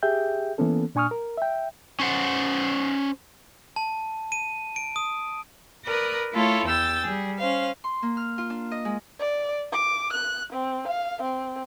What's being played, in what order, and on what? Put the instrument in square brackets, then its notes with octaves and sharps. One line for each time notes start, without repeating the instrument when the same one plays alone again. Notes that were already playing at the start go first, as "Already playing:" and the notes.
[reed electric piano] G4 G#4 E5 G5 G6
E3 A#3 B3 C#4 A4
A#2 D4 G#5 C#6 D#6 F6
A#4
E5 G5
[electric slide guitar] C#4 C5 F#5
[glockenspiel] A5
D#7
D7
D#6
[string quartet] A#4 B4 D5 D#6
A3 E4 F4 A4 C#5
E2 G5 E6 A6
G3 G#4
C#4 C5 F5
[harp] C6
A#3
F6
F4
D4
D#5
G#3
[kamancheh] D5
D6
F#6
C4
F5
C4